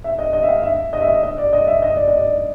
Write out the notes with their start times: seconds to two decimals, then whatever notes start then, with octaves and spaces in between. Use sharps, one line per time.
0.04 E5
0.19 D#5
0.33 D#5
0.43 E5
0.49 F5
0.63 E5
0.93 D#5
1.01 E5
1.08 D#5
1.23 D#5
1.38 D5
1.53 D#5
1.67 E5
1.82 D#5
1.96 D5
2.08 D#5
2.17 D5